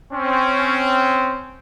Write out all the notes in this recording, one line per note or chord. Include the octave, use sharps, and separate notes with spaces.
C4 C#4